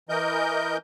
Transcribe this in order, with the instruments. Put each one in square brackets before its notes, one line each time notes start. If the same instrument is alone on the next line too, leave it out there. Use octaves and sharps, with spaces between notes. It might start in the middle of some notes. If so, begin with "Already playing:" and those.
[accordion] E3 A#4 D#5 G6